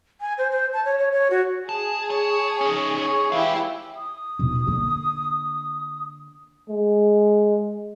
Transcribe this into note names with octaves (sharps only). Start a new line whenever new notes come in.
G#5
C5
C5
A5
C#5
C#5
C#5
F#4
G#4 A5
C#5 A5
C#4 D#4
C#5
E3 G#3 E4 G4 F5
D#6
D#1 B2
D3 A#3
G#3